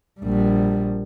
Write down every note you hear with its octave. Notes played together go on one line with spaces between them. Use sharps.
A#1 G3